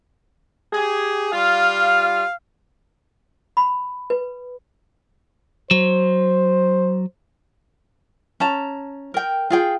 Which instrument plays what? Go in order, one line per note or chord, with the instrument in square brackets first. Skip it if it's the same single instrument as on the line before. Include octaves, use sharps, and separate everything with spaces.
[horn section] G4 G#4
[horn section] G3 F4 [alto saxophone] F5
[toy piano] B5
B4
[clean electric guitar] F#3 [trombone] C5
[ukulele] C#4 A5 A#5
A#4 G5
F4 G#4 G5